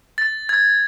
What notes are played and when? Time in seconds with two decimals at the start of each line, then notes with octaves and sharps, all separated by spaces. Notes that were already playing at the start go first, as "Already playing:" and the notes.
0.18 A6
0.49 G#6